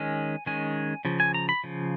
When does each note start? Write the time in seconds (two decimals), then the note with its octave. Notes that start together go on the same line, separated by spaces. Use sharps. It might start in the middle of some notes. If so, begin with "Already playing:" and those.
Already playing: D#3 G#3 C#4 G#5
0.46 D#3 G#3 C#4 G#5
1.05 C#3 F3
1.20 G#5
1.34 A#5
1.49 B5
1.64 C#3 F3